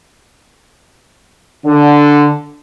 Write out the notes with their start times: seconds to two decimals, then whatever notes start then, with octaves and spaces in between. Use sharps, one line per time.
1.65 D3